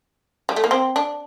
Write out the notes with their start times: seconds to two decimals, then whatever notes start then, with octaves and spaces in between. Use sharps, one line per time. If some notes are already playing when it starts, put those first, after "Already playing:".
0.49 G3
0.56 A3
0.64 A#3
0.71 C4
0.96 D4